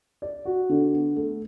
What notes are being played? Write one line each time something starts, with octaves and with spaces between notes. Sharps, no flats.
D5
F#4
D3
B3
A3